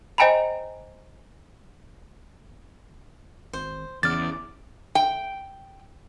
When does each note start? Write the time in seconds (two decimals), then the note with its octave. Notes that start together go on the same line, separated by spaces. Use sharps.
0.18 C5 D#5 G5 G#5 A#5 B5
3.53 G#1 C5
4.03 E2 C#3 D5 F6 A6
4.95 G5